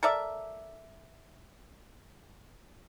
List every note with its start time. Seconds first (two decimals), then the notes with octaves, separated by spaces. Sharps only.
0.03 A4 A#4 D5 E5